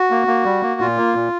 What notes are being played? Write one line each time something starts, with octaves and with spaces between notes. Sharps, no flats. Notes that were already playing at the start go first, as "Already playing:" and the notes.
Already playing: F#4
A#3
A#3
G3
A#3
A#2 F4
A#3
A#2